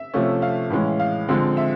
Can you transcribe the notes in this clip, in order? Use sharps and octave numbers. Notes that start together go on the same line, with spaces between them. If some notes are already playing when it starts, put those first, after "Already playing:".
Already playing: E5
C3 F3 A3 C#4
F5
A2 E3 G#3 C#4
F5
D3 F3 G#3 C4
E5